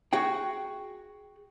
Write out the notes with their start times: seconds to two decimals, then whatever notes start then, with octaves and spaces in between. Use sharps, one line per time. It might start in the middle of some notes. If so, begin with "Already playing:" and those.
0.13 F#4 G#4 G5